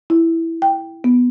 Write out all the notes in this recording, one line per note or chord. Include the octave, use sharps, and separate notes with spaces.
E4
G5
B3